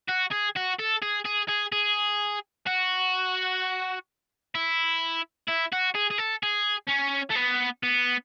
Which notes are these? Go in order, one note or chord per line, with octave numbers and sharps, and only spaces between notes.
F#4
G#4
F#4
A4
G#4
G#4
G#4
G#4
F#4
E4
E4
F#4
G#4
G#4
A4
G#4
C#4
A3
B3
B3